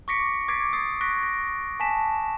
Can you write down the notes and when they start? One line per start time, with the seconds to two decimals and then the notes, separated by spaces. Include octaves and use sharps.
0.08 C#6 D6 A#6 B6 C#7 D7
0.48 D6 G#6 A6 B6 C7 D7
0.73 D#6 A6 C7
1.01 C#6 F#6 A#6 B6 D7
1.23 A#6
1.80 G#5 A5 B6 E7